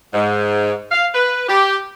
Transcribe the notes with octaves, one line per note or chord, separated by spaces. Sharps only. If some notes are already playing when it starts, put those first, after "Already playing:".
G#2
F5
B4
G4